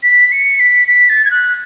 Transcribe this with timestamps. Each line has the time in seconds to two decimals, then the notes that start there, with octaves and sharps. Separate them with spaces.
0.03 B6
0.32 C#7
0.60 B6
0.88 B6
1.09 A6
1.25 G#6
1.31 F#6